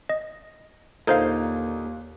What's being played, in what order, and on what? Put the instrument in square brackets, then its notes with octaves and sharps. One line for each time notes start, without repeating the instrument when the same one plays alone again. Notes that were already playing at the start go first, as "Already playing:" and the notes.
[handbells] D#5
[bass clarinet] D#2 [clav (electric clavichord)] A#2 D3 D#4 [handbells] A4 C5 F5